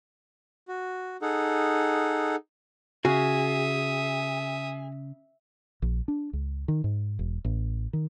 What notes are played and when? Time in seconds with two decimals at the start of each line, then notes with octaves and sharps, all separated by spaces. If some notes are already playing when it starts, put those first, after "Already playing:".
0.68 F#4
1.22 D#4 G#4 A4 F#5
3.05 C#3 F#4 G#4 E5 F5 D#6
5.82 A#1
6.08 D4
6.33 C#2
6.68 D#3
6.84 G#2
7.19 E1
7.45 A1
7.93 D#3